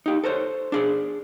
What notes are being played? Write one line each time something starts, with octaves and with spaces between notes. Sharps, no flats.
D#4 G4
A4 A#4 C5 C#5
D4 G#4 D5